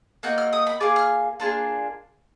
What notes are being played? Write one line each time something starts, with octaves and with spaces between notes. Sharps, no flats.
A#3 D#4 F#4 F#6
F6
D#6
B5
A#3 F4 G#4 D6
F6
A#3 D4 F4 G#4